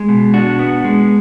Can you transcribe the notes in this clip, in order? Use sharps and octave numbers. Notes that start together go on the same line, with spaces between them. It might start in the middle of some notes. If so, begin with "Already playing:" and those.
Already playing: G#3
B2
D4 F#4
B3
G#3